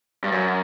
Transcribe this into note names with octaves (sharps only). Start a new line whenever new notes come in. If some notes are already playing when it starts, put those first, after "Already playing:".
G2
F#2